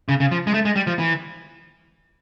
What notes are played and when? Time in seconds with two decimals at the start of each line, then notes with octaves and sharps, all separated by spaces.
0.09 C#3
0.20 C#3
0.31 F3
0.47 G#3
0.54 A3
0.65 G#3
0.76 G3
0.87 F3
0.99 E3